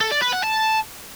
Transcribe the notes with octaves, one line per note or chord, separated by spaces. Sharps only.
A4
D5
B4
F#5
A5